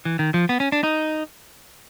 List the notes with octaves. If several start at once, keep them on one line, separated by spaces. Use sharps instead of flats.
E3
D#3
F3
B3
C#4
D4
D#4